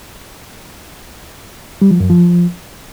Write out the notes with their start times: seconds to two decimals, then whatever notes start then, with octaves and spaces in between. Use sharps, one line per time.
1.82 G3
1.91 F3
2.00 F#2
2.10 F3